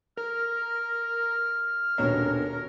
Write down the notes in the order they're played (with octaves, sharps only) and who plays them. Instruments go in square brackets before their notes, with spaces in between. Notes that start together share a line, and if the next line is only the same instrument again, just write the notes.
[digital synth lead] A#4 [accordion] F6
[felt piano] D#1 B2 C#5 [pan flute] D4 [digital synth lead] A#4